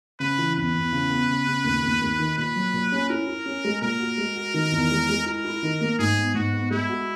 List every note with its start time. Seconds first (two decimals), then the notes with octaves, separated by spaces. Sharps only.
0.20 C#3 B4
0.38 E3
0.56 E2 B4
0.75 E2
0.93 C#3
1.10 B3
1.29 C#3
1.47 C#3
1.64 D#2
1.83 D#2
2.02 D#2
2.19 D#3
2.37 A#2 B4
2.56 F#3
2.73 A#2
2.92 C#4
3.09 E4 A#4
3.27 E4
3.46 C#4
3.64 G#3
3.82 A#2 A#4
4.00 F#4
4.18 G#3
4.36 F#4
4.54 D#3
4.72 E2
4.91 G#3
5.09 G#3
5.26 E4 A#4
5.45 E4
5.63 D#3
5.81 A#3
5.99 G#2 G#4
6.17 B3
6.34 G#2 F#4
6.53 B3
6.71 G#3 E4
6.89 F#4